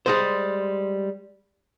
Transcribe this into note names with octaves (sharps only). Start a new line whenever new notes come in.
G3 G#3 C5